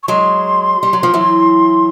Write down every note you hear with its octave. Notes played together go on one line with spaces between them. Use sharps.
C#6
F#3 G#3 C6
G3
F#3
F3
E3 F#3